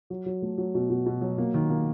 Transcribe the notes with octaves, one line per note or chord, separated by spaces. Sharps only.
F#3
F#3
A3
F#3
B2
B2
B2
F#3
A#3
D#3
A#3